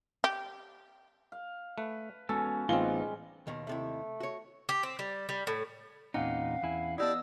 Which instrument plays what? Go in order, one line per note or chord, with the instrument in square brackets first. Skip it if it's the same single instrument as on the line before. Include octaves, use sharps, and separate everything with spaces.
[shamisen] G4
[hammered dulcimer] F5
[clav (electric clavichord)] A3 [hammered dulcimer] B4
[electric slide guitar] G#3 B3 F#4 [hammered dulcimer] C#4 [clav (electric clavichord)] A4
[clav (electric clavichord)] A1 C4 [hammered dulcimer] G3 G#3 [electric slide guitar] B3 D#4 [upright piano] F4 G7
[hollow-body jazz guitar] D#2 B2 D#3
[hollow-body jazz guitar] D#2 C3 E4 [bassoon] A3
[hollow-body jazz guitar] F#4 C#5
[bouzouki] G4
C4
G3
G3
A2
[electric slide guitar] E2 A#2 D#4 [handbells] C4 C#4 F#5 [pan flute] F5
[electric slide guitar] E2 E4 G#5
[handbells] B3 D#5 D#6 [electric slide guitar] E4 G4 A5 [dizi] D5 [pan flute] E6